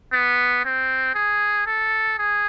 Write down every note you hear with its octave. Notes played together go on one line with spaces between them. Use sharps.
B3
C4
G#4
A4
G#4